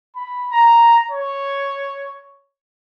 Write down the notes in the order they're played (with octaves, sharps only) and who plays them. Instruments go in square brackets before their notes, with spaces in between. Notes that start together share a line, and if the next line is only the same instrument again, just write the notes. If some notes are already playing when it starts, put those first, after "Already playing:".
[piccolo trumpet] B5
A#5
C#5